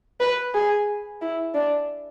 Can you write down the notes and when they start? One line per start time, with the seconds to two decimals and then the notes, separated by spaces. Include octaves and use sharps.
0.20 B4
0.54 G#4
1.22 E4
1.54 D4